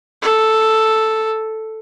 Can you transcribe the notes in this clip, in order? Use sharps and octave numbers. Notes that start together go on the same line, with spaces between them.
A4